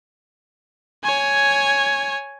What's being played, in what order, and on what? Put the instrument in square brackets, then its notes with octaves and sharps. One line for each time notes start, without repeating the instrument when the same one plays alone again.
[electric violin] C#5 G#5